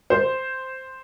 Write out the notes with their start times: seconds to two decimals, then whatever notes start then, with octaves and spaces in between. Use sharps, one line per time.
0.10 C5